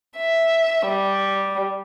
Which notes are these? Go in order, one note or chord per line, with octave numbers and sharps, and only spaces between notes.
E5
G3